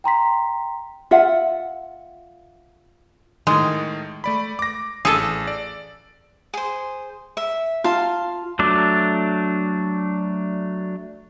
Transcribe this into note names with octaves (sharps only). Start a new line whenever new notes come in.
G5 A#5 C6 B6
F4 E5 F#5
A2 D#3 G#3
A3 D5 B5
D6 A#6
A1 G#4 A4 E6 C#7
D5
G#4 C5
E5
F4 F5 A5
F#3 A3 D4 D6